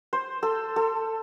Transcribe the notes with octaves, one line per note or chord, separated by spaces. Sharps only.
C5
A4
A4